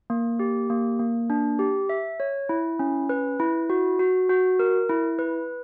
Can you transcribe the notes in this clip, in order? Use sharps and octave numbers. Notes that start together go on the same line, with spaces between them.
A#3
G4
A#3
A#3
D4
G4
E5
C#5
E4
C#4
B4
E4
F#4
F#4
F#4
A#4
E4
B4